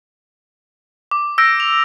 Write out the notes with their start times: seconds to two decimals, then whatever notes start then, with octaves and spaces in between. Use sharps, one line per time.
1.11 D6
1.38 E6 G6 A#6 D7
1.60 F7